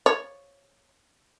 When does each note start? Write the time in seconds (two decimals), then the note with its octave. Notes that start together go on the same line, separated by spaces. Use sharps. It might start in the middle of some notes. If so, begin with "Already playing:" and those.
0.06 C#5